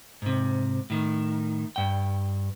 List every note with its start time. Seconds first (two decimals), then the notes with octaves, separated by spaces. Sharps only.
0.22 G#2 C3
0.90 A2 D#3
1.76 G2 G5